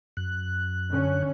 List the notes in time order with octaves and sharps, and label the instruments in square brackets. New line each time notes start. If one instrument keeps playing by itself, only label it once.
[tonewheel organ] F#2 F#6
[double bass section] D3 C#4